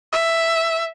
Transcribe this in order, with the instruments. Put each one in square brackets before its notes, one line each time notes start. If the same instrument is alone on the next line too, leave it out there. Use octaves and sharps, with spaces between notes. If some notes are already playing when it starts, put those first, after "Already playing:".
[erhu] E5